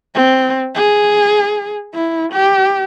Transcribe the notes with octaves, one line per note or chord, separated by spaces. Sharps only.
C4
G#4
E4
G4